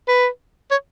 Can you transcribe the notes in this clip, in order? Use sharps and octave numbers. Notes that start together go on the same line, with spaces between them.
B4
C#5